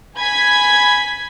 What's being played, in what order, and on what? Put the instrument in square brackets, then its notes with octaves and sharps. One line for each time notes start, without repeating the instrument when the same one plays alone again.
[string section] G#5 B5 G#6 B6